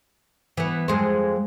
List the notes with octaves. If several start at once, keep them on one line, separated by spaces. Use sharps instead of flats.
E3 B3
F2 G#3 C5